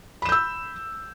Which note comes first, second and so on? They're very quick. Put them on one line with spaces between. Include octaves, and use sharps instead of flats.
B5 E7 G6 E6